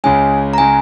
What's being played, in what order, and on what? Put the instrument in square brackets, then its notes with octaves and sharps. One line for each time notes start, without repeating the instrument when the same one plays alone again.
[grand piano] C#2 C#3 G#3 C#4 [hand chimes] G#5
[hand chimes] A#5
[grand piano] C#3 G#3 C#4 [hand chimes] G#5